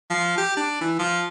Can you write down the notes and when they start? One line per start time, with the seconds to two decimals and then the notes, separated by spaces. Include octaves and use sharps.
0.10 F3
0.38 G4
0.57 D4
0.81 E3
0.99 F3